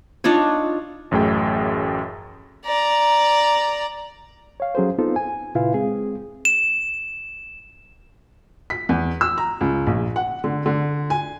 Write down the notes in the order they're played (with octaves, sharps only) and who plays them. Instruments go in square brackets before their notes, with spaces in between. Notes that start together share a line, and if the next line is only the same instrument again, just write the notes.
[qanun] D4 D#4 F4 C#5
[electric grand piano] A1 F#2 A3 G#4 G5
[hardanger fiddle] D5 A#5
[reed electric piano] C#5 F5
F#3 C#4 G#4 A4 C5
B3 C4 D#4 F4 A4 C5
G#5
A#2 C#3 E4 F4 B4 F5
G#3 C4 G#4
[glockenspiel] E7
[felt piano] B6
E2
E6
A#5
C#2
A#1
F#5
D3
D3
G#5